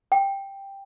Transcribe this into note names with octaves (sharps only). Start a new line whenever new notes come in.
G5